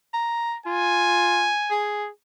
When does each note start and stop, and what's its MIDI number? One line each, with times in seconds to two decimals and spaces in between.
0.14 0.54 82
0.66 1.52 65
0.66 1.93 80
1.71 2.08 68